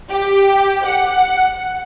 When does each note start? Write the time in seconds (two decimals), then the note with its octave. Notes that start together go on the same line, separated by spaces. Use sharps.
0.10 G4
0.84 F#5